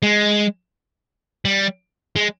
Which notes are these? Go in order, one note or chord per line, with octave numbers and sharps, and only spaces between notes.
G#3
G3
G#3